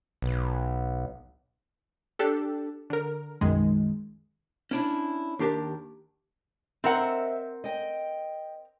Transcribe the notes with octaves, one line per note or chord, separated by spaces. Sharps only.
B1
D4 G4 A4
D3 A#4
B1 F#2 D#3 G#3
C#4 D4 E4
D#2 D4 G4 A#4 A5
C4 A#4 C5 D#5 E5 F#5
D#5 G5